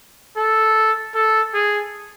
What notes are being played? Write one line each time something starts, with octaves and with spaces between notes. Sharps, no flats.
A4
A4
G#4